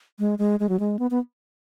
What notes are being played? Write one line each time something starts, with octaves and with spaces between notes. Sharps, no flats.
G#3
G#3
G#3
F#3
G#3
B3
B3